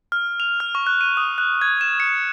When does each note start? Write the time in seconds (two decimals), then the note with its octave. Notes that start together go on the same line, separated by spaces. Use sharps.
0.12 F6
0.40 F7
0.60 F6
0.75 C#6
0.87 F#6
1.01 D#7
1.17 D#6
1.38 F#6
1.62 G#6
1.81 E7
2.00 C#7